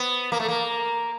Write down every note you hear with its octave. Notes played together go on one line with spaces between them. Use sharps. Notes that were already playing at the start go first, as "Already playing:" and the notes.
Already playing: B3
A#3
A3
A#3